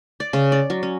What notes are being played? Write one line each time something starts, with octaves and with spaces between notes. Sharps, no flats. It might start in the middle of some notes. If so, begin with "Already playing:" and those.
D5
C#3
D5
F#3
C#4